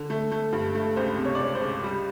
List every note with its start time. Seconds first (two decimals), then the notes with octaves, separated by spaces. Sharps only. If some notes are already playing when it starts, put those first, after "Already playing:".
Already playing: D3
0.10 A3
0.31 A3
0.53 G2
0.75 A3
0.96 C#2 C5
1.18 C3
1.25 C#5
1.35 D5
1.40 C#2 C#5
1.55 C5
1.62 C#2
1.84 G3